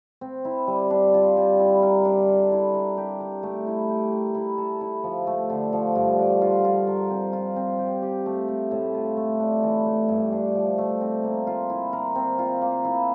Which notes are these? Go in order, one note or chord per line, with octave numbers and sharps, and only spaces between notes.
C4
E4
G3
D4
F4
G3
E4
A#4
D4
A4
E4
A#4
G4
A#4
A3
E4
G4
A#4
E4
A4
E4
F3
A3
D3
F3
G2
D4
F4
F4
A#4
C4
F4
C4
G4
G4
A3
A3
A2
F4
A3
D4
E3
A3
G2
D4
F3
A3
C4
A#3
F4
E4
A#4
C4
F4
A#3
E4